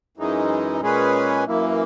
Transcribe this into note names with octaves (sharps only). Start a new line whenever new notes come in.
F#2 E3 G#3 D#4
A#2 G#3 C#4 G#4 B4
F#2 E3 A#3